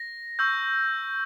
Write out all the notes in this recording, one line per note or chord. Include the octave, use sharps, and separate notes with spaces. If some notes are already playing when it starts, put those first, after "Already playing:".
Already playing: A#6
C#6 E6 G6